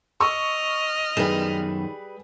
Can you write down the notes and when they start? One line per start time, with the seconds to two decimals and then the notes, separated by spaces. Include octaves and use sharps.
0.20 D#5 C#6 E6 F6
1.17 F#2 D#3 G3 G#4 B4 E7